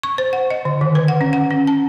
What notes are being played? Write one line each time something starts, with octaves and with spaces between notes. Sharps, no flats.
C#6
C5
F#5
D#5
D3
D#3
B4
F#5
C#4
F#5
C#4
A5